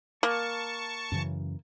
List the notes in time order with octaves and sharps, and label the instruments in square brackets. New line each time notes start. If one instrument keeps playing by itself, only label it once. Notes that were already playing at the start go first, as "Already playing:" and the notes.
[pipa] A#3 [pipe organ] A5 C#6
[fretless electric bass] F#2 C#3 E3